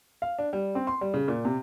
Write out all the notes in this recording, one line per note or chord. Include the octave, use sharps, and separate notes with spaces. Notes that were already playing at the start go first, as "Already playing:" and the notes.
F5
D4
G3
C4
C6
G3
C#3
A#2
C3